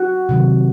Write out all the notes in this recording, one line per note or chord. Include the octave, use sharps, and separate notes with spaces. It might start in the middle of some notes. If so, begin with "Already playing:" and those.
Already playing: F#4
C3 D#3 F#3